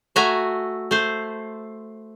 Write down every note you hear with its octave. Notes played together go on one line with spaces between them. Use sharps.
A3 F#4 E5 G#5 A#5
A3 C5